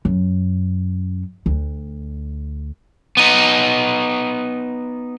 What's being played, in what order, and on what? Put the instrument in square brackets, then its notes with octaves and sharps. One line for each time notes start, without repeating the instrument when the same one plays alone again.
[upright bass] F#2
D2
[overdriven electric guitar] B3 D#4